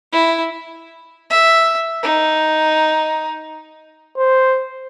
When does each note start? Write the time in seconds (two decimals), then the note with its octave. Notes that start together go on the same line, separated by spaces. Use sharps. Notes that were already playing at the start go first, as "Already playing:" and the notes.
0.12 E4
1.30 E5
2.03 D#4
4.18 C5